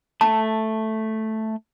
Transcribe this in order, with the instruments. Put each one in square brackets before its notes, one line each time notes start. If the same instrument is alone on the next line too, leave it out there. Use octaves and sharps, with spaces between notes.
[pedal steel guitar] A3 [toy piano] A5